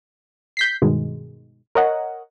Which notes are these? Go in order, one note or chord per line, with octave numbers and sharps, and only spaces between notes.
G6 B6 C7
G2 B2 D#3 G#3
A#4 C#5 D#5 F#5